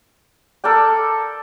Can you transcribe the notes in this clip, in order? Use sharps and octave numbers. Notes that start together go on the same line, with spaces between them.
A4 A#4 D5 G5